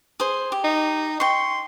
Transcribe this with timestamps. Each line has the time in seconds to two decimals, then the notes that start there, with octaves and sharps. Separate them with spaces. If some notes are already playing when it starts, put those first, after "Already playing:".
0.20 G#4 C5
0.52 G4
0.64 D#4
1.20 G5 C6 C#6